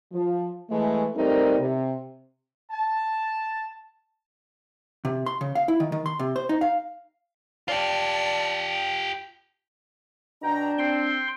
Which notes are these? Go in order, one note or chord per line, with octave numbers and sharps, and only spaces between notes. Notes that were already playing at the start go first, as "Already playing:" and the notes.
F3
E3 G#3 A3
G3 A3 C4 D#4 A#4
C3
A5
C3
C6
C#3
F5
E4
D#3
D#3
C6
C3
C5
D#4
F5
F4 G4 D5 A5
B2 D4 G5 A#5
C4 G5 C6